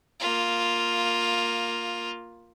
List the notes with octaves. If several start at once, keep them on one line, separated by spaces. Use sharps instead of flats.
A#3 F4